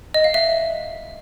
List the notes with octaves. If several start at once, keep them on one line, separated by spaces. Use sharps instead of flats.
D#5
F5
E5